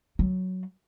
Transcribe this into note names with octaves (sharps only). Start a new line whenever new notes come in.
F#3